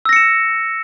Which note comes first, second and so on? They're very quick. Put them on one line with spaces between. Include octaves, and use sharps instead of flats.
E6 A#6 C#7 E7